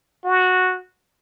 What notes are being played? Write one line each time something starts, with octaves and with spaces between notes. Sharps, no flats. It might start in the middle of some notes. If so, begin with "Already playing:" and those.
F#4